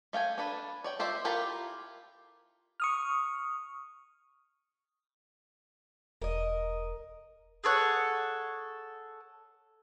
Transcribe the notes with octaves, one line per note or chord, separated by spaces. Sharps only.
A3 F5 G5 G#5
D4 A4 B4
C#5 D5 G5
F4 G4 C5 D5 E5
E4 F4 G4 A4 A#4
C#6 D#6 F6
E1 A#4 D#5
G#4 A4 C#5 F#5